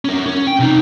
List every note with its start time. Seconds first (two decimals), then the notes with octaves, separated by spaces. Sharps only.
0.05 C#4 A#4
0.26 C#4
0.47 G5
0.60 C3 D#4